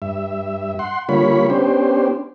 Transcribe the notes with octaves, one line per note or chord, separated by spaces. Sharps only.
G2 E5
F#5 C6
D3 G3 A#3 F4 C#5 B5
B3 C#4 D4 G4 C5